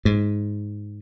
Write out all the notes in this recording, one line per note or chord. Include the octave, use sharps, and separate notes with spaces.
G#2